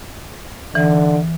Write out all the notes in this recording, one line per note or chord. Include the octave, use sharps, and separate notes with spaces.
D3 E3